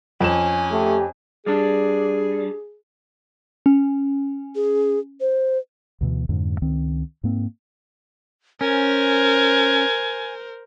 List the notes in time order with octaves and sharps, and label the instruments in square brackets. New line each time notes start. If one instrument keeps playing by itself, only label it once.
[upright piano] F2 E7 [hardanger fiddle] C#4 G#5
[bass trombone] A3 [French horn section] G4
[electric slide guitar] G3 D4 [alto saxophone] G#4
[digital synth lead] C#4
[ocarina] G#4
C5
[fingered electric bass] D2 B2 E3
F2 G#2 D3
C#2 D#3 C4
G#2 A#3 C4
[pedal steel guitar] C#4 [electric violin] A#4 C5 [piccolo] G#5